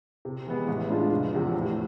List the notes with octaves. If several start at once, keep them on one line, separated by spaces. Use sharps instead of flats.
C3
E3 G#3 B3
A1
A2 G#3 D4 F4
F1
E2 C3 F3
A2